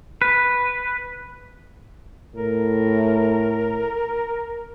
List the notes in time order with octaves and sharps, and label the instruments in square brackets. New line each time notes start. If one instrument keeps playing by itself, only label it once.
[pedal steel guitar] B4
[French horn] A2 [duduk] A#4